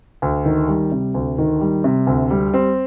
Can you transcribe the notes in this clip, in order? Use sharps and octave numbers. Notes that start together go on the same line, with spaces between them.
D2
D#3
G3
C3
D2
D#3
G3
C3
D2
G3
C4